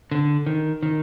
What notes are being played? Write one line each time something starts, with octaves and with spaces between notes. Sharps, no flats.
D3
D#3
D#3